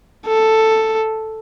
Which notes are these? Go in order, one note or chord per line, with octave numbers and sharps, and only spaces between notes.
A4